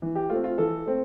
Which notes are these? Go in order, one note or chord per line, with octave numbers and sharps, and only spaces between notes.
E3
G4
A3 C4 F4
F4
E3 A4
A3 C4